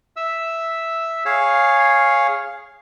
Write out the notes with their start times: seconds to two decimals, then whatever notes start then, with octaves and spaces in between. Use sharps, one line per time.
0.16 E5 E6
1.25 G#4 C#5 F5